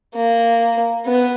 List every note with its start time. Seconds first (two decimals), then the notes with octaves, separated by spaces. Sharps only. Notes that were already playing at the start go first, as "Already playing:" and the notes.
0.15 A#3
1.06 B3